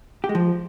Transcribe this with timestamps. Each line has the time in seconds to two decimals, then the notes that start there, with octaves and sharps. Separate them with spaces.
0.24 G4
0.29 G#3
0.35 F3